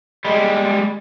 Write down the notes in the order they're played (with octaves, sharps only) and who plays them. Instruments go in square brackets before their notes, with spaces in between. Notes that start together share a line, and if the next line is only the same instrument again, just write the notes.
[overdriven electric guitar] G3 G#3